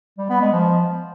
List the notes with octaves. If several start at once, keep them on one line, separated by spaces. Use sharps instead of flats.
G3
B3
G#3
F3